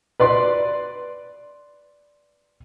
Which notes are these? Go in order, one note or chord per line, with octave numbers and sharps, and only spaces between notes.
B4 D5 C6